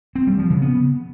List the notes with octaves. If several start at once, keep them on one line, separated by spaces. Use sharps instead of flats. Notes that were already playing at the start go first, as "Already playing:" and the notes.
C4
G3
F3
C#3
B3